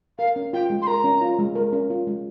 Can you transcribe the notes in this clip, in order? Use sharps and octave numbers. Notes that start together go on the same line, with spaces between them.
A#4 F5
C#4
F4 G5
G#3
C6
A#4 A#5
C#4
F4
G#3
A#4
C#4
F4
G#3